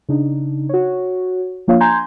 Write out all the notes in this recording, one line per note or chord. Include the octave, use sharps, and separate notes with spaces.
C#3 D4 D#4
F#4 C#5
F3 A#3 D4 F4 C#5 F5
G#5 A#5 C6 G6 G#6